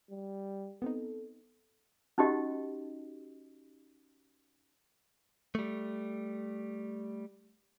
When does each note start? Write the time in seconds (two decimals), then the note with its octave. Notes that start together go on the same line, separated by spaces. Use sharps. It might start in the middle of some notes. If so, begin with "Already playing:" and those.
0.11 G3
0.82 B3 C4 D#4 A4
2.18 C#4 D#4 F#4 G4 D#5
5.55 G3 A3